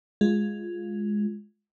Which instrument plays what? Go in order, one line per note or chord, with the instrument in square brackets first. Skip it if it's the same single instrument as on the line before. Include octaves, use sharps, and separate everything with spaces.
[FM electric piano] G#3 F4